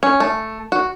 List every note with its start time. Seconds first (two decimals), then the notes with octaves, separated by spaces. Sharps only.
0.03 C#4
0.20 A3
0.72 F#4